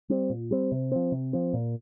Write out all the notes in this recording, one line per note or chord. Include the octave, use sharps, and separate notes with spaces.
G3 C4
A#2
G3 C4
C3
F3 C4
C3
F3 C4
A#2